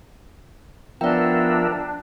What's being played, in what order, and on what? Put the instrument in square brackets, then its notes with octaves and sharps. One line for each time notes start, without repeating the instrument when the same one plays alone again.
[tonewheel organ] F3 A#4 E5 [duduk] B3 [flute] D4 [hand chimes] D5 G5